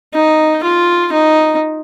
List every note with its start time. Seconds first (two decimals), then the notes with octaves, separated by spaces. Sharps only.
0.14 D#4
0.63 F4
1.12 D#4